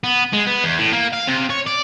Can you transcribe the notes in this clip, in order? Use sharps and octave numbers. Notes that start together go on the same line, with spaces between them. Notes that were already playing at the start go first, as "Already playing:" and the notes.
B3
G#3
B3
E2
A2
A#3
F5
C3
C#5
D5